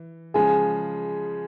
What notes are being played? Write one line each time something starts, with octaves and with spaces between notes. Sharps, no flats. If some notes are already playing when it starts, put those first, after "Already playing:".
Already playing: E3
C#3 F3 G#3 G#4 G#5